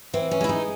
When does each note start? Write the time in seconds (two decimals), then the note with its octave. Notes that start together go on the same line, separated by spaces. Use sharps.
0.14 E3 C4
0.31 C#4
0.41 G#3 E4
0.49 D#4